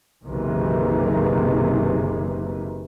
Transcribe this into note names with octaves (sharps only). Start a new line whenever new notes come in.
F#1 B1 C3 D#3 E3